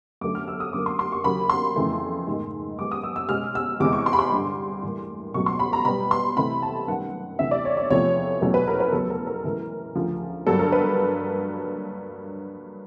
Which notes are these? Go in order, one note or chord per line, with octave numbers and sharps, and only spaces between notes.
F#2 D3 F#3 A3 C#4 D6
F6
E6
D#6
F#2 D3 F#3 A#3 D6
C6
C6
C#6
D#2 C#3 F#3 A#3 B5
C6
F2 C#3 E3 A3
G#2 D#3 G#3
F#2 D#3 G#3 B3 D6
D#6
E6
E6
B2 G#3 C#4 F6
E6
E2 C3 E3 G#3 D6
C#6
C6
B5
C6
G2 D3 G3
A2 E3 G3 A#3
C#2 B2 F#3 A3 C#4 C#6
C6
B5
A#5
B2 G3 B3 B5
C6
C3 E3 A3 B5
A5
F#2 D#3 G3 B3 F#5
D2 C3 E3 E5
D5
C#5
D5
E2 C3 F3 A3 C#5
E2 B2 F#3 A3 C#4
B4
A#4
B4
E2 C#3 F#3 B3 A4
A#4
A#4
A2 E3 G#3 C#4
D2 C#3 F3
G2 D3 F#3 A#3 A4
A#4
B4